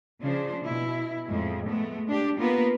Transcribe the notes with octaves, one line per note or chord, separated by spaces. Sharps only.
C#3 F3 D4 C5
B2 E4
F2 A2 G#3
G#3 A3 B3
D4 G4
A#3 B3 F4 A#4 B4